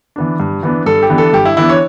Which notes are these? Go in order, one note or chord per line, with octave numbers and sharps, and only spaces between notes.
E3 B3 D4
G2
E3 B3 D4
G2 A4
G4
E3 B3 D4
A4
G2 G4
E4
E3 B3 D4 E4
C#5